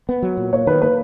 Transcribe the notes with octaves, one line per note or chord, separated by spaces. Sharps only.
B3
F#3
A#2
A#3 C#5
D#3 B4
A#3 B4